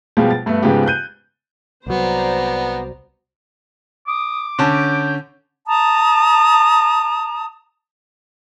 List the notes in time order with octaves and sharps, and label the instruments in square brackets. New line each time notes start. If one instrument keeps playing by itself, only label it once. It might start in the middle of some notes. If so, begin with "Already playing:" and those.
[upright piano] B2 F3 G3 G#3 F4 G4
A6
G2 A3 B3
G#2 C#3 F3 G#3 B3 G4
F#6 G6 D#7
[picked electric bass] C2 F#3 [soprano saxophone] B3 [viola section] C5 D5 A#5
[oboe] D6 [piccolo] D#6
[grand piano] D3 C#4 A5 [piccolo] G6
[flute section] A5 A#5 D#6